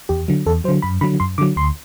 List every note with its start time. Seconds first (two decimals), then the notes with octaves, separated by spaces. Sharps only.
0.09 E2 G4
0.28 D3 F#3
0.46 E2 A4
0.64 F#3 C5
0.68 D3
0.82 F#2 B5
1.01 D3 F#3 B5
1.20 F#2 C6
1.38 D3 F#3 D6
1.56 D2 C6